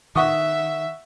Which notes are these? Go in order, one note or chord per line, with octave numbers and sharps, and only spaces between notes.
D#3 E5 F#5 C#6 D#6